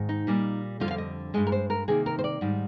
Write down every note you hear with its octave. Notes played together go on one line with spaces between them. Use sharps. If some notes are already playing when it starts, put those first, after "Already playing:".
Already playing: G#2 D#3
D#4
A#2 G3 A#3
F2 D3 G3 F4
F5
D#5
G2 D#3 G#3 D#5
A#4
C5
A#4
C3 D#3 A#3 G#4
A#4
C5
D5
G#2 D#3 G3